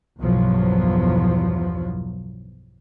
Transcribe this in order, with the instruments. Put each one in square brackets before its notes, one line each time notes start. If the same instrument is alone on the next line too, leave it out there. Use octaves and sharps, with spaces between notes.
[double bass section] B1 E2 G2 F3 F#3